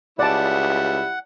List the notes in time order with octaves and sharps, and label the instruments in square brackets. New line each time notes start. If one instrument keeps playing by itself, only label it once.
[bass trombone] C#2 [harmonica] G3 E4 [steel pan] D5 A5 [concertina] F#5